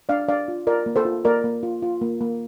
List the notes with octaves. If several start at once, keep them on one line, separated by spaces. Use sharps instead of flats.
D4 D5 F5
D4 D5 F5
F4
F4 A#4 D5
A#3
A4 C5
F4
A#3 A#4 D5
A#3
F4
F4
A#3
A#3